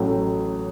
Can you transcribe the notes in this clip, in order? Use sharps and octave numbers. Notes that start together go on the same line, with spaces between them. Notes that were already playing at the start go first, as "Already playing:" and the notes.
Already playing: A1 A2 F#3 A3